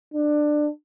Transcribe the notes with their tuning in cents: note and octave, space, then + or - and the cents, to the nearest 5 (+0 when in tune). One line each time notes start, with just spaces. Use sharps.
D4 +20